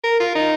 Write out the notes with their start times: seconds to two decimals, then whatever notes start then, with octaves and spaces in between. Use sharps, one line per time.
0.04 A#4
0.20 F4
0.36 D#4